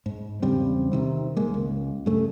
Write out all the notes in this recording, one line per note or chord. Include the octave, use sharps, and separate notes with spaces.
G#2
E2 C#3 G3 C4
C3 D#3 C4
G#1 G#3 A#3
C#2
G2 C#3 A3